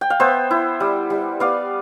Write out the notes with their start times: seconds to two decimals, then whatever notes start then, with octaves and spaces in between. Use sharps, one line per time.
0.01 G5
0.10 F5
0.20 B3 C5 E5
0.51 E4
0.80 G3
1.10 G3
1.40 B3 D5 F5